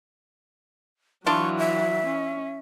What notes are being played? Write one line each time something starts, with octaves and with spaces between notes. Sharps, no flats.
E3 F#3 D4 E4 F4 C#6
E5
C#4